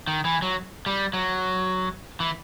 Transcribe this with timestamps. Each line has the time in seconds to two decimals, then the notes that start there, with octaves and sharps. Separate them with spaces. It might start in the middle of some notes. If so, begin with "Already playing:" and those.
0.07 D#3
0.25 E3
0.42 F#3
0.86 G3
1.13 F#3
2.20 E3